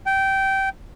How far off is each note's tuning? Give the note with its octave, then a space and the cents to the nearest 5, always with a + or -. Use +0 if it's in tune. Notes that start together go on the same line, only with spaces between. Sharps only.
G5 -15